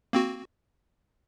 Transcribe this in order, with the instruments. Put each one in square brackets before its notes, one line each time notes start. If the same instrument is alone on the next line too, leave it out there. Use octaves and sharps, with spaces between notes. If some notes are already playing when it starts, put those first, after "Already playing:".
[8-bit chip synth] A#3 C4 F#4